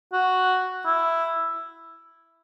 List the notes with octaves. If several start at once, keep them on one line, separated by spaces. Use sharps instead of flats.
F#4
E4